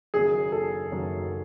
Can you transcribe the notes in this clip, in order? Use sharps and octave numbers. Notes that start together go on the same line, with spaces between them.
F#1 F#2 D#3 F#3 A#3 G#4
A4
F#1 F#2 D#3 F#3 A#3